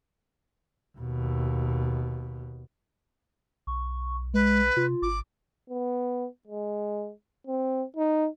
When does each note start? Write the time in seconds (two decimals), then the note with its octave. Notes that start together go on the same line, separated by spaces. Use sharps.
0.98 D#2 B2
3.67 B1 C#6
4.34 G#3 B4
4.77 C3 F4
5.02 G#1 D6
5.70 B3
6.48 G#3
7.47 C4
7.96 D#4